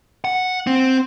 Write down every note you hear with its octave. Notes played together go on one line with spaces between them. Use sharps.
F#5
C4